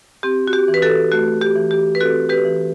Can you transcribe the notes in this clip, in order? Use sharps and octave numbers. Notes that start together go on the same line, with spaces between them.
C4 G4
F#4
G4
E3
B4
F#4 A4
A3 F#4
G4
E3
G4
B4
C4 F#4 A4
G4 B4
E3